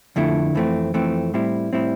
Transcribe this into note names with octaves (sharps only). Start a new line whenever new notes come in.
F2 D3 A3 E4
F2 E3 A3 C4
F2 E3 A3 C4
A2 G3 C4 E4
A2 G3 C4 E4